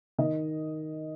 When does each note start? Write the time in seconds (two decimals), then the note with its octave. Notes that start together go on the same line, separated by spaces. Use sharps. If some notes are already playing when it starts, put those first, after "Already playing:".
0.18 D#3 D#5